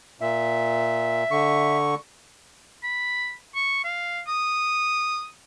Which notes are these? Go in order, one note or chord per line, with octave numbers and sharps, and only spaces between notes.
A#2 E5
D3 C#6
B5
C#6
F5
D#6